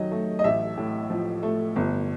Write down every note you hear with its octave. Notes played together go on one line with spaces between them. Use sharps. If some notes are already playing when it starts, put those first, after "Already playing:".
Already playing: D#3 F#3 D#5
A3
D#5
A1 E5
A2
F3
A3
G1